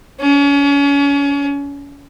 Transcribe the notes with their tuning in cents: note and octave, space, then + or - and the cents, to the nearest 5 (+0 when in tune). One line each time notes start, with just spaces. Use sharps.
C#4 +35